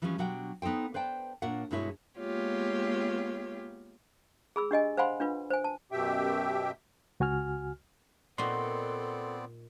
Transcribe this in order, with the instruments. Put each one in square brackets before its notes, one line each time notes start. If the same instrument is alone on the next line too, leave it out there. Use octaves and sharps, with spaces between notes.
[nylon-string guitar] E3 F3 G3 G#3 C4 C#4
B2 F#3 D4 F#5 G5
B3 D#4 A4 C5 G5
B4 C5 D5 G5 A5
A#2 A#3 D4 F4 C#5 F#5
G2 B2 G#3 E4 G#4 C#5
[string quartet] G#3 A#3 B3 F4 G4 C#5
[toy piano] G#4 B5 E6
D4 G4 D#5 G#5
C5 F5 F#5 G#5 B5 C6
D4 F4 B4
C5 G#5
A5
[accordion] F#2 B2 G4 E5 G5
[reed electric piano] C#2 F#4 G#5 F6
[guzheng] A#2 D#4 F#4 [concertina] B3 C4 D5 [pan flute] A4 [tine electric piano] C6